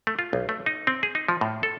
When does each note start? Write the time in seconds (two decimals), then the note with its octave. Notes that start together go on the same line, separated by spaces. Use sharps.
0.07 A3
0.19 F4
0.33 B1
0.49 A3
0.66 D#4
0.87 C4
1.03 G#4
1.15 D#4
1.28 F3
1.41 A2
1.63 A4